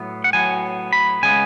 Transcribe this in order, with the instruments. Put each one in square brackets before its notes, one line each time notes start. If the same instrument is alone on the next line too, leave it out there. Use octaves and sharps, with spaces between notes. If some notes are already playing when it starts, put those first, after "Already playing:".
Already playing: [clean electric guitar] A2 F#3 B3
F#5
A2 F#3 B3 G#5
B5
C#3 G#3 B3 G#5